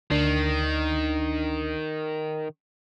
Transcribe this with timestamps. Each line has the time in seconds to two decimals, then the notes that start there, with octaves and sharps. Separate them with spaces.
0.11 D2 D#3 D4 C7